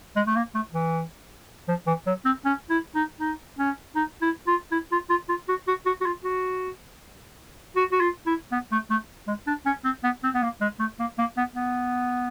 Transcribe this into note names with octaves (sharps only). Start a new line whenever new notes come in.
G#3
A3
A#3
A3
E3
F3
E3
F#3
C4
C#4
E4
D#4
D#4
C#4
D#4
E4
F4
E4
F4
F4
F4
F#4
F#4
F#4
F#4
F4
F#4
F#4
F#4
F4
E4
B3
A3
A3
G#3
D4
C#4
C4
B3
C4
B3
A#3
G#3
A3
A#3
A#3
B3
B3